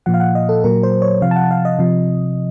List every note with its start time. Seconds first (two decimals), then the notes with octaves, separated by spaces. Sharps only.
0.06 A#2 F3 F#5
0.14 F5
0.20 F#5
0.35 D#5
0.49 A4
0.64 A#2 F#3 A#4
0.83 C5
1.02 C#5
1.22 C3 F3 F5
1.31 A5
1.36 F#5
1.51 F5
1.65 D#5
1.79 C3 F3